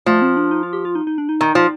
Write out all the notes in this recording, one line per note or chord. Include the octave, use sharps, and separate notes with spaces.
F3 A3
C4
D4
D#4
F4
G4
F4
D#4
D#4
D4
D#4
D#3
F3